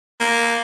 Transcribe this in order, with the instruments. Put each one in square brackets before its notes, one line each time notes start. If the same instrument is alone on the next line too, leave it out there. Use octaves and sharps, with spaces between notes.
[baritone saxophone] A#3